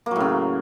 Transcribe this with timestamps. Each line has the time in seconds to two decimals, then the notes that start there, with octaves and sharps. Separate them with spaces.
0.06 A#3
0.11 F#3
0.16 A2
0.20 C#3